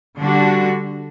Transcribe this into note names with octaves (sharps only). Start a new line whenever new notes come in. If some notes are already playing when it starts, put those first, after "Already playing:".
D3 G3 D4 F#4